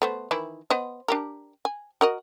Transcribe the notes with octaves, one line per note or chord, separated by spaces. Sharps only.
A3 B3 C5
D#3 E3 E4
B3 C5 D#5
D4 G4 A#4
G#5
F#4 A#4 D#5